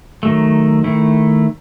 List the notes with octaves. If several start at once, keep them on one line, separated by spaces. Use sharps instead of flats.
D#3 F#3 A3
D#3 A3 E4